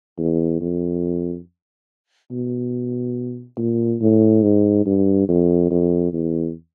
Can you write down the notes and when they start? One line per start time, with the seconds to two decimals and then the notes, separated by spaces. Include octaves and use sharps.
0.18 E2
0.61 F2
2.31 B2
3.58 A#2
4.01 A2
4.43 G#2
4.86 G2
5.29 F2
5.71 F2
6.13 E2